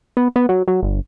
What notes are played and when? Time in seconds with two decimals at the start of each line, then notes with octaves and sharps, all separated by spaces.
0.17 B3
0.36 B3
0.49 F#3
0.68 F#3
0.83 G1